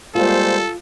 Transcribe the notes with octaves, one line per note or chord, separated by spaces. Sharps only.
G3 G#3 A#3 F4 A4 C5